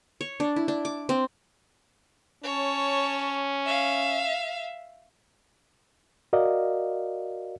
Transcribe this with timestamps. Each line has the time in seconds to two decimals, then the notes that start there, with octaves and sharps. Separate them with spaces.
0.21 C#5
0.40 D4
0.56 E4
0.68 D4
0.85 D6
1.09 C4
2.44 C#4 C#5 A5
3.66 E5 F5
6.33 F#4 A#4 D5 D#5 F5